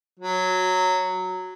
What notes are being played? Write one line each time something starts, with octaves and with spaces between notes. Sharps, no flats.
F#3